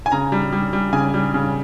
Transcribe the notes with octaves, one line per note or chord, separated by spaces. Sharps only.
G#5
C#3 A#5
G3
G3
G3
C#3 G#5
G3
C#3